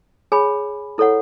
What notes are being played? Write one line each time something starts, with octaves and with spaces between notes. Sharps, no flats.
G#4 C#5 G#5 B5
E4 A4 C#5 F#5